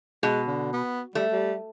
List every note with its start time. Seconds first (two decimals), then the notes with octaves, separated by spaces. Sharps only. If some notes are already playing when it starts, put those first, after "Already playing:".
0.23 B2 G#3
0.47 D3
0.73 B3
1.15 G3 A3
1.32 G3